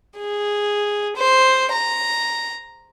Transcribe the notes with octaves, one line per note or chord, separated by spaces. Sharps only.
G#4
C5
A#5